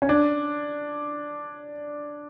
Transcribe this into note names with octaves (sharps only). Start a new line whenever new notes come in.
C#4
D4